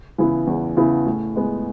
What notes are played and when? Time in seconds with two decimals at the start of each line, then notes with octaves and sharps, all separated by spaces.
0.18 C#3 E3 B3 E4
0.47 E2
0.77 C#3 E3 B3 E4
1.06 A2
1.36 G#3 B3